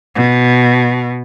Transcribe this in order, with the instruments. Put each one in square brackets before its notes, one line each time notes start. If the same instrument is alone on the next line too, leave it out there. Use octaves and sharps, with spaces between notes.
[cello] B2